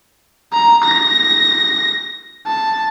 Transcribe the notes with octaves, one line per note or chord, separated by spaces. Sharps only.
A#5
A#6
A5